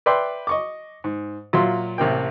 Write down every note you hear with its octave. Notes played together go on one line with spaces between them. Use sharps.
B4 D5 E5 G5 C6
D#5 C#6 D6
G#2
A#2 F#3 F4 E5 C6
A1 C3 A#3 G5